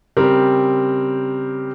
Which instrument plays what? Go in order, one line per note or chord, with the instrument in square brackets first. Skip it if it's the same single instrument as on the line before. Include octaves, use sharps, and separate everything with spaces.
[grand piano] C#3 G3 C4 G4 A#4